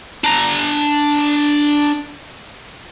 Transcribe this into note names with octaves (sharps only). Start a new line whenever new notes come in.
D4 A#5